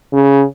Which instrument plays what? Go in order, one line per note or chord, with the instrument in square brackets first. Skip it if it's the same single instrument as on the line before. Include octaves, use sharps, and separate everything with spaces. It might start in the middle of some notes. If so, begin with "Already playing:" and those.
[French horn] C#3